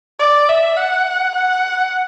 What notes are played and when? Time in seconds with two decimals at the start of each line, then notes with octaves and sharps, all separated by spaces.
0.19 D5
0.49 E5
0.76 F#5
1.35 F#5